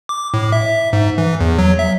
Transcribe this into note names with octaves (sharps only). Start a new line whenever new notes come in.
D6
A2
E5
G#2
E3
E2
F#3
E5